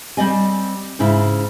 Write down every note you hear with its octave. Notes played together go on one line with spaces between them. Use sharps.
G3 C4 D5 D#5 G#5
G#2 C#3 E4